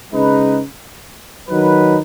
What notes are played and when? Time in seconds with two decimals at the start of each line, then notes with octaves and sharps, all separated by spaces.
0.12 C#3 G#3 D#4 B4
1.49 D#3 F#3 D#4 B4